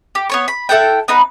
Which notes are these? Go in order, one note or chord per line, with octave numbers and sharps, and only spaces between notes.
G4
B3 C#5 C#6
B5
E4 A4 F#5 G5
B3 D#4 B4